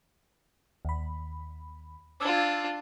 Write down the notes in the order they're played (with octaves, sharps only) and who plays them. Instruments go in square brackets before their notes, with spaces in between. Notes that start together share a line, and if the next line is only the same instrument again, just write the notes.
[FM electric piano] D#2 B5
[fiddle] D4 F4 [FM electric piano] D6 E6 G#6